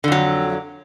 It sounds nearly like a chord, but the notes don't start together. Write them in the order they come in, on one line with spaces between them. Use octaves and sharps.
D3 F2 F#3